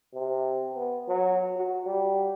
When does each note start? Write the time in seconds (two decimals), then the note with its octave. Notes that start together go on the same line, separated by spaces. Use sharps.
0.13 C3
0.74 B3
1.08 F#3
1.56 F#4
1.85 G3